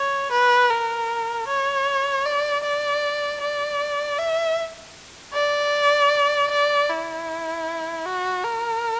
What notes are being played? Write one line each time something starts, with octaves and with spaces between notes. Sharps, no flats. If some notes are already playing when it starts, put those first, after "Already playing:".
Already playing: C#5
B4
A#4
C#5
D5
D5
D5
E5
D5
D5
E4
F#4
A#4